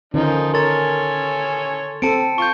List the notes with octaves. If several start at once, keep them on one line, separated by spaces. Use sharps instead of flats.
D3 D#3 F3 C#4 D#4
A4 A#4 C#5 G#5 C6 A6
C4 A4 A5 C#7 D7
F4 C#6 G6